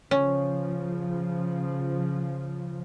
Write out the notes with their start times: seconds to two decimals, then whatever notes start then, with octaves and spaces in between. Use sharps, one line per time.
0.11 C#3 F3 C#4